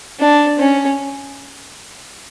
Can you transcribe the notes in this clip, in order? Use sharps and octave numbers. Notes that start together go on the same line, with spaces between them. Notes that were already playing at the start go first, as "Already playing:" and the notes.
D4
C#4